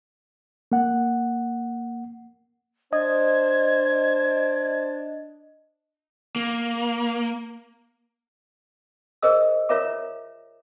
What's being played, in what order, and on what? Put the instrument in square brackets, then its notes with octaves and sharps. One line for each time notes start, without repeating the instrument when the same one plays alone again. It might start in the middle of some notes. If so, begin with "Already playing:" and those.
[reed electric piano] A#3 F#5
[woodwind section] D4 [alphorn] C5 [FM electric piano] D#5 [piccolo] G#6
[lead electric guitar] A#3
[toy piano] G#4 A#4 C5 D#5 D#6 E6
F4 A#4 C#5 E5 A#5 D6